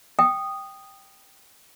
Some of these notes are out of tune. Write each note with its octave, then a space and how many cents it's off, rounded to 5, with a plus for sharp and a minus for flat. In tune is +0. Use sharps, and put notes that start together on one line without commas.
G5 +0 D#6 -10